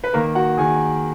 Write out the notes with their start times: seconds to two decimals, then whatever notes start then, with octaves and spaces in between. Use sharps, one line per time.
0.04 B4
0.13 D#3 A#3 A#4
0.35 F#4 F#5
0.57 D#3 G#4 G#5